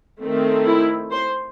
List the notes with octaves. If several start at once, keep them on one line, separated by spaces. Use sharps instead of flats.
D#3 A3 C4
E4
C5